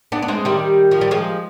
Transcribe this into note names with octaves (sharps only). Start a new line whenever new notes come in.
B3 D4
B3
G#3 C4
D#3 G3
F3
G3
F3 G#3